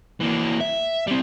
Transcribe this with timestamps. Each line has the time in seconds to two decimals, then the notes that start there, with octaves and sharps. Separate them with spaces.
0.21 E3 A#3
0.60 E5
1.07 G3 C4